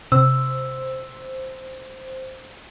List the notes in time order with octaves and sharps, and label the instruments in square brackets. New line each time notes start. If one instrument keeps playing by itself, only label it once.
[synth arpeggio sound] C3 [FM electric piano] C5 [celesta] E6